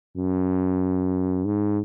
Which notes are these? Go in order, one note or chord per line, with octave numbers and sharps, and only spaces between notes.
F#2
G#2